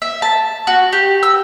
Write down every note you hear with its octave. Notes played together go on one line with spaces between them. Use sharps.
E5
A5
F#4
G4
E6